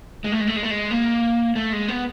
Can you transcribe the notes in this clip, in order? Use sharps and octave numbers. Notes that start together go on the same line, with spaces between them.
G#3
A3
G#3
A3
G#3
A3
G#3
A#3
A3
G#3
B3